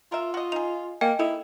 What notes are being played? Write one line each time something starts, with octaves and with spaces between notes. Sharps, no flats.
F4 A#4 E5
F#4 D#5
D#4 G#4 F7
A#3 D#5 G5 G#5
D#4 E4 A4